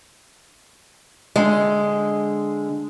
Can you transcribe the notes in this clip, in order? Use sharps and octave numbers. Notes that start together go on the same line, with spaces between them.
D3 G#3